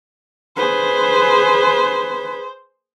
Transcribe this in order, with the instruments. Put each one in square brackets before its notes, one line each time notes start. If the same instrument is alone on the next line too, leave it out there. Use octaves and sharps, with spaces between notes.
[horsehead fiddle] G#4 B4 [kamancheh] C5